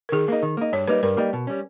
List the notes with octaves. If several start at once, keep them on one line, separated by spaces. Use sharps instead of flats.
A#4
D#3 G#4
A#3 D#4 A#4
D#3
A#3 D#4
G2 C#5
G3 A#3 D#4 B4
G2 A#4
G3 A#3 D#4
B2
G3 C#4